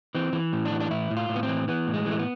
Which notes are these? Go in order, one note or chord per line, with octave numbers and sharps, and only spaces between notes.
E3 C4
E3
A2
D4
E3
D4
A2 E4
A2
F4
A2
B3
C4
E3
E3 B3
A2
G#3
E3
A3
B3